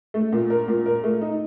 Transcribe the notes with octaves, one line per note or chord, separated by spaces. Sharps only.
A3
A#2
A#4
A#2
A#4
A3
D#4